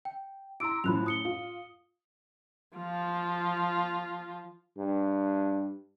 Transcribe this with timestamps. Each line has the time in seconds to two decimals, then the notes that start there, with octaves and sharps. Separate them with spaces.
0.05 G5
0.60 E4 A#5 C6 D6 E6 D7
0.84 F#2 A2 F3 B5 F#6 F7
1.06 A2 D#6 C#7 G7
1.25 F4
2.77 F3 F4
4.78 G2